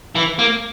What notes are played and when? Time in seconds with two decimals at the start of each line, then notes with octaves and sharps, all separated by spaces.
0.15 E3
0.39 A#3